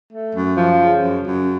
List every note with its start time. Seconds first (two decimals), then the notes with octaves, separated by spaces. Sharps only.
0.12 A3
0.35 F#2
0.57 F3
0.79 C#3
1.02 F#2
1.23 F#2